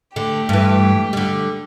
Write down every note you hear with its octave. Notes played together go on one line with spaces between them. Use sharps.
D3 A3 G4
G2 E3
D3 G3